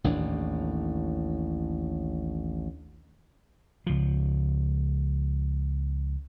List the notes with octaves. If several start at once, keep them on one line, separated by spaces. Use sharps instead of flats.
A1 D#2 A2 D4
C#2 F3